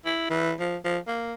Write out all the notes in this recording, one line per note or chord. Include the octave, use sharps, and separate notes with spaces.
E4
E3
F3
F3
A#3